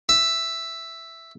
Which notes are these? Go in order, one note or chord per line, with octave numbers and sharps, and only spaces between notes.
E5